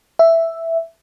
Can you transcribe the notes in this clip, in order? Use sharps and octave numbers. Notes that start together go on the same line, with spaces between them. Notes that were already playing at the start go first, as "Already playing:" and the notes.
E5